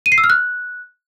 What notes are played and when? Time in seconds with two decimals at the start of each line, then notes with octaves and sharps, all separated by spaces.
0.06 D#7
0.12 C7
0.18 E6
0.24 F6
0.30 F#6